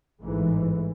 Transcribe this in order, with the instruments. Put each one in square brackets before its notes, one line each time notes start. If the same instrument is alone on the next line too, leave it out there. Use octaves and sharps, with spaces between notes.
[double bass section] A1 G#2 E3